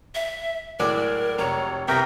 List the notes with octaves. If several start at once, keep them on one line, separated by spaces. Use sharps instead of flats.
E5
A2 F#3 G#3 A#4 D5
F1 C#5 A#5 C#7
C2 B3 A#4 E5 G5 A#6